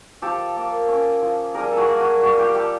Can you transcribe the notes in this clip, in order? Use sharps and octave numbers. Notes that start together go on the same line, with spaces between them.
F3 G4 A4
A#3
C#4
F3
G3 G#4 A#4
A4
F#4 G#4
A#3
F#4
G3 F#4
F4 G4
G3 G4 A4